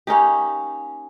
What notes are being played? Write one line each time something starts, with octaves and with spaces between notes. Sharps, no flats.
A#3 C#4 D#4 G4